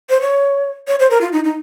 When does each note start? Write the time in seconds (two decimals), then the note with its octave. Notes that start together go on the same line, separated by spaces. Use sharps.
0.10 C5
0.21 C#5
0.88 C#5
1.00 C5
1.11 A#4
1.21 F4
1.32 D#4
1.44 D#4